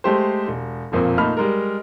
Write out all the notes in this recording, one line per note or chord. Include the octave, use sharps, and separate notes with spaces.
G#3 A3 G4 C5
E1
E1 F2 A#2 A#3 C4
A#2 A3 D#4 B5 F6
G3 G#3 A#4